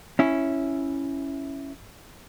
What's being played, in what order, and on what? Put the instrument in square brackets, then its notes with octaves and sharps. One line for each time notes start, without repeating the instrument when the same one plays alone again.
[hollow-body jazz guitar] C#4 E4